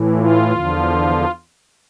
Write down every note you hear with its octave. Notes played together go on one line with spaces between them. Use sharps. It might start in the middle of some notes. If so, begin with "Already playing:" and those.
Already playing: A2 E3
F4
E2 D3 F3